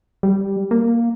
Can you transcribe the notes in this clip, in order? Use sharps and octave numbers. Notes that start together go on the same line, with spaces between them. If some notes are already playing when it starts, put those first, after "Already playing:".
G3
A#3